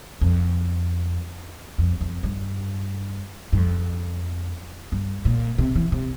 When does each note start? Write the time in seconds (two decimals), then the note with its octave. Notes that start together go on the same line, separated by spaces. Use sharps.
0.21 F2
1.78 F2
2.01 F2
2.23 G2
3.53 G2
3.57 F2
4.92 G2
5.25 A#2
5.58 C3
5.75 E3
5.92 C3